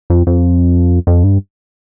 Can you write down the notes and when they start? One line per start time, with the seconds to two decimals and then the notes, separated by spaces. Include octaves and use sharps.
0.10 F2
0.27 F2
1.07 F2
1.24 G2